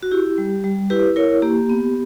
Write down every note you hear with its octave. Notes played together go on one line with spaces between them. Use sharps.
F#4
E4 G4
G3
G3
E4 G4 B4
E4 A#4 C#5
A#3 G4
B3